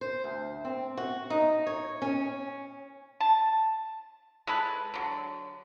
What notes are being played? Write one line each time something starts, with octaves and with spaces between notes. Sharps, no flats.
C5
D2
C4
F#4
D#4
C#5
C#4
A5
G#3 A4 B4
D3 F#3